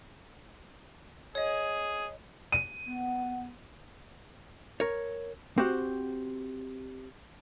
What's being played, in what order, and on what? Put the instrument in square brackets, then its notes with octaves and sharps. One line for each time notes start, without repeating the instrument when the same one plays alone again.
[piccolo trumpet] G#4 [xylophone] C#5 D#5
[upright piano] D#7
[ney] B3
[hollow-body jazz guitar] A#4 C#5
C4 F#4 G4 C5 F#5